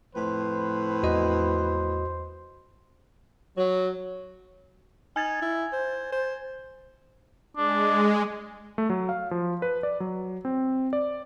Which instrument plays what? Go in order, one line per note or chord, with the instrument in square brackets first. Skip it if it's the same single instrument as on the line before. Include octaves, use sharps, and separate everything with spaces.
[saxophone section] F2 A2 B4 [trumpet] C5
[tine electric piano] E2 F#4 D#5
[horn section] F#3
[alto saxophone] D#4 [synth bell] G#5 G#6 A6
[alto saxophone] E4
C5
C5
[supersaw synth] G#3 [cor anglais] D4
[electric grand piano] A3
F#3
F5
F3
B4
D5
F#3
C4
D5